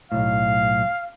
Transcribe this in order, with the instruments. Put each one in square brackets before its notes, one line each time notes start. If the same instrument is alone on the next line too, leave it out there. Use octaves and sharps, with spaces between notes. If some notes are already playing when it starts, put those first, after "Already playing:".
[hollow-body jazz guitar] B1 A2 [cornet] F5